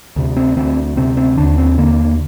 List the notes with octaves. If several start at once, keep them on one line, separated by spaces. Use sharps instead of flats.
D2 C3
C4
D2 D3 C4
D2 C3 C4
C4
D#2 D3 D4
C4
D#2 D3 A#3